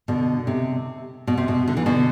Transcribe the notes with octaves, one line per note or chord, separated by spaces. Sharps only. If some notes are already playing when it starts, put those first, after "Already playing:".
B2 D3
C3
B2
C3
B2
D3
E3
B2 D3